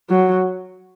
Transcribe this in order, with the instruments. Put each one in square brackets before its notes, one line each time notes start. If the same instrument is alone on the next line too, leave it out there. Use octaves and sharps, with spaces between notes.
[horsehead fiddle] F#3